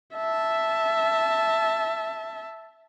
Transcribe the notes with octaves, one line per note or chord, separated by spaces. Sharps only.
E5 A5